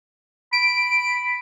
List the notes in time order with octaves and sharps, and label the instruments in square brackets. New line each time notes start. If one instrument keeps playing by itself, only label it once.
[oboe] B5 [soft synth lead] D7